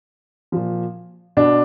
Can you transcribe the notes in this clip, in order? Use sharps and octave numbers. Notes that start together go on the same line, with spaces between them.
A#2 F3
B2 D4